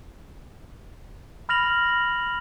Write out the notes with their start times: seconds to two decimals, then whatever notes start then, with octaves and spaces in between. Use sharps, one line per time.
1.49 B5 F6 A#6 F7 F#7